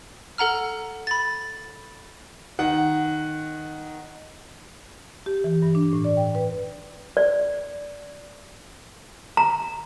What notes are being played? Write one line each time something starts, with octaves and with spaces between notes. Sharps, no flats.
A4 F#5 A#5 F6
B5 A6
D#3 F#5
G4
E3
G2
D4
A2
D5
G5
B4
D5
A#5